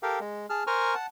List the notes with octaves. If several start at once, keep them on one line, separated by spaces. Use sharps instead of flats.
G4 A4 A#4 F5 G5
G#3
G#4 A5 F6
A#4 C5 G#5 A#5 C#6 F6
F#5 A5